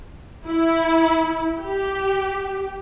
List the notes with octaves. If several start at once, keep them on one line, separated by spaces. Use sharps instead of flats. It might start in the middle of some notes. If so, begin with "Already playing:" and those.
E4
G4